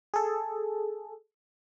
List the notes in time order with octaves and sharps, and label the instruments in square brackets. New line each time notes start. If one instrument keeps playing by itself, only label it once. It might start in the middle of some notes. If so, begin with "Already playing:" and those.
[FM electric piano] G#4 A4